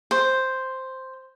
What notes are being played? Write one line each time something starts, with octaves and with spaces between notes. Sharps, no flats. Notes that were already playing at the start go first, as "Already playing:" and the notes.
C5